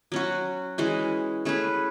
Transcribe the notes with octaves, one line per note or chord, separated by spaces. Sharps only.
F#3 C#4 F#4
E3 G#3 C#4 F#4
A3 C#4 G#4 B4